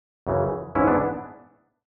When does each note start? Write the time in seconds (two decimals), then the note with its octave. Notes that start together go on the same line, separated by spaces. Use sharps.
0.27 F#2 C#3 E3
0.75 G#2 E3 C#4 E4
0.87 B3 D4